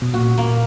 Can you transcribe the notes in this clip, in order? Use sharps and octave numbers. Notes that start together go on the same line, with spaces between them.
B2
A#2 F#4
A#3